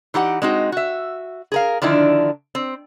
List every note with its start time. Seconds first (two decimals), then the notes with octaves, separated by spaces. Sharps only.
0.14 E3 D#4 G4 F#5
0.42 G#3 C4 D#4 F#4
0.72 F#4 E5
1.52 G#4 A#4 F5
1.82 D3 D#3 F3 D4 E4
2.55 C4